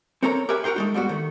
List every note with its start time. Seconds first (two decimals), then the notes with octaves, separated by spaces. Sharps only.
0.22 C4 A4 A#4 C#5 F5 A#5
0.49 G4 A#4 B4 E5 G#5
0.64 F#4 G#4 A#4 G5 C6
0.76 G#3 A3 D#4
0.94 G#2 G3 B3 F#4
1.09 D#3 A3